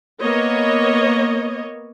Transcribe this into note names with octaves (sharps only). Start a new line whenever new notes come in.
A#3 B3 C#5 D#5